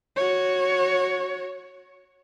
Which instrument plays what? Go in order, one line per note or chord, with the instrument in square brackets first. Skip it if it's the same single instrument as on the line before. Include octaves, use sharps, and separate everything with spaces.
[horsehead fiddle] F#4 C#5